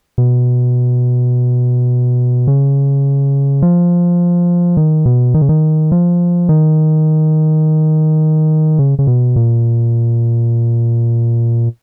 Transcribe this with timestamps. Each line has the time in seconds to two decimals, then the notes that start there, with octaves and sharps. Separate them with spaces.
0.18 B2
2.47 C#3
3.62 F3
4.77 D#3
5.06 B2
5.34 D#3
5.41 C#3
5.49 D#3
5.92 F3
6.49 D#3
8.79 C#3
8.99 C#3
9.07 B2
9.36 A#2